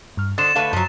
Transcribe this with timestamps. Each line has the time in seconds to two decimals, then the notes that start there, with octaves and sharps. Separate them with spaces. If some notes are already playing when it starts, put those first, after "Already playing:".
0.17 G2 F6
0.38 D3 C5 D#6 A6 E7
0.55 D3 A3 B4 F5 A5
0.73 F#2 F3 F#3